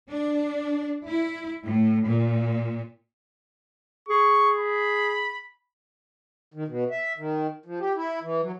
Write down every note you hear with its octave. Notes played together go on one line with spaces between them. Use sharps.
D4
E4
A2
A#2
G#4 C#6
B5
D#3
B2
E5
D#3
F3
G4
E4
E3
F#3